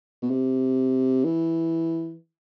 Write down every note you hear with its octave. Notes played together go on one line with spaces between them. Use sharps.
B2
C3
E3